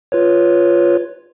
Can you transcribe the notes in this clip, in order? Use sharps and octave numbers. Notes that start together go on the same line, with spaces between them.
F4 B4 C#5